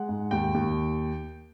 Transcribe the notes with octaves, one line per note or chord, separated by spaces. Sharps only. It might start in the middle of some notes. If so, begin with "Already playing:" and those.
Already playing: G#3 F#5
G#2
D#2 G5
D#2